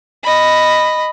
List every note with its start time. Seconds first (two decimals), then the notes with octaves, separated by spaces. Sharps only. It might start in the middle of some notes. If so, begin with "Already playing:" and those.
0.24 D#5 B5